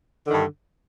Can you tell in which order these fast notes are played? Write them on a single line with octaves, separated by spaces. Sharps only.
D3 D#3 G2